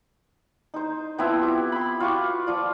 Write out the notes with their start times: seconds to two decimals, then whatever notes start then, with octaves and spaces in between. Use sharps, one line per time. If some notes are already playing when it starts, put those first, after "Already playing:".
0.74 D#4 C5
1.18 F3 B3 C4 E4
1.43 G4
1.72 B5 C6
2.00 F4 F#4 C#6 D6
2.47 F3 F4 D5